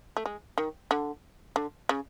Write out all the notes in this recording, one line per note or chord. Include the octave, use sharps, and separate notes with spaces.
A3
G#3
D#3
D3
D3
C#3